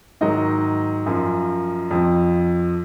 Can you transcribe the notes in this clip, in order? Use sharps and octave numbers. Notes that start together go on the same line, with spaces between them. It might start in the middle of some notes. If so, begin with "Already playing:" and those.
G#2 D#3 F#3 D#5
F#2 F3
F2 F3